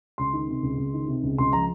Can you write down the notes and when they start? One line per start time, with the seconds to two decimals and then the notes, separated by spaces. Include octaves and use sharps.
0.18 C#2 C6
0.33 D#3
0.48 C3
0.63 C#2
0.78 C#2
0.94 D#3
1.08 C3
1.23 C#2
1.38 C#2 C6
1.53 F3 A#5